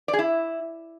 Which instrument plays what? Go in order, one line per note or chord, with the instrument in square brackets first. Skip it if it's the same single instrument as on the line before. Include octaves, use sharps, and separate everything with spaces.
[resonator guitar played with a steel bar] D5
G#4
E4